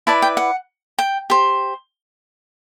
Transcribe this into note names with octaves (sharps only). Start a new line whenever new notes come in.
E4 B4 D5 A5
G5
F#5
G5
G4 C5